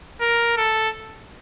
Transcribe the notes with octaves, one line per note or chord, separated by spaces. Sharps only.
A#4
A4